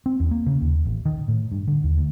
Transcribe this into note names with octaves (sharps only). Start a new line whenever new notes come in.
C4
E2
A#3
C#3
D#2
A1
D#3
A2
G2
D3
D#2
D2